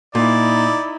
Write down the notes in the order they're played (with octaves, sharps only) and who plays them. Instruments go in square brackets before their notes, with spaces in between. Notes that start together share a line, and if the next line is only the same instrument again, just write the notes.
[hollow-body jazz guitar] A#2 [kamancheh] D#4 E4 [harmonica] D5